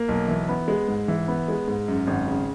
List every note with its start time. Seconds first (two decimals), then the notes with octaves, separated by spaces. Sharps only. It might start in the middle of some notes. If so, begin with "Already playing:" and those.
Already playing: A#3
0.09 B1
0.28 E3
0.49 B3
0.68 G#3
0.88 G#2
1.08 E3
1.28 B3
1.48 G#3
1.68 G#2
1.88 F#2
2.07 G#1
2.28 C#3